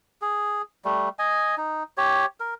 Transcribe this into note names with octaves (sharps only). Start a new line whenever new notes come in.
G#4
G3 A3
D#5 G#5
D#4
G4 C#5
A#4